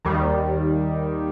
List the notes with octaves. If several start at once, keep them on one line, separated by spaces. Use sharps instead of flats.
D#2 D#3 G3